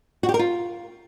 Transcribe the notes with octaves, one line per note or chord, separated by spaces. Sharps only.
F#4
G4
A#4
F4